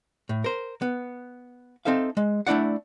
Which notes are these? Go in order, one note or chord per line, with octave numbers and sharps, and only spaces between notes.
A2
A#4 C5
B3
C4 D#4 A4 E5 F5
G#3
A3 D4 E4 D5 F#5